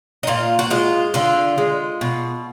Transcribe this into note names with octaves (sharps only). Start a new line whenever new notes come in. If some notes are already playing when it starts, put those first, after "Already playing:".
D#4
A#2 F4
F#4
G#3 F4
D3 F4
G#3
B2